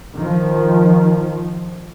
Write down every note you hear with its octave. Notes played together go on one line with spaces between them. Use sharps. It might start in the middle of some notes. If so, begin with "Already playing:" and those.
D#3 F3